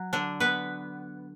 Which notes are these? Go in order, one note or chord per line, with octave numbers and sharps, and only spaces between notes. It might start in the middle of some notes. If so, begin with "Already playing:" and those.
Already playing: F#3
D3 D4
B3 B4